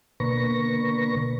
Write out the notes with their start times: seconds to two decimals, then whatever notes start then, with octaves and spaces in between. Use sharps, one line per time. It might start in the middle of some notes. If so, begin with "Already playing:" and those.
0.20 B2 D3 A#3 B4 C#6 A#6